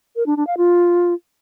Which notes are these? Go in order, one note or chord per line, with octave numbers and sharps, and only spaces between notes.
A#4
D4
D4
F5
F4